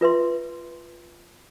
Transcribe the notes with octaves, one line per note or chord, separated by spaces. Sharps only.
F4 B4 E5 C6